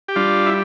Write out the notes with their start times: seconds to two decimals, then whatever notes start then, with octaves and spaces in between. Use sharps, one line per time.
0.08 G4
0.16 G3 D4 F4
0.46 E4